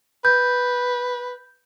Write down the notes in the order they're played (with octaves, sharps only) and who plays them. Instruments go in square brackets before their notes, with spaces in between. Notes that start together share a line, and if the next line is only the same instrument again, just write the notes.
[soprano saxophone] B4 [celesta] G6